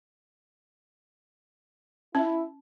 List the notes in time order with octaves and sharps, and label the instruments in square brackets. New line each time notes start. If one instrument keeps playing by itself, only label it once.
[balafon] C#4 [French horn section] E4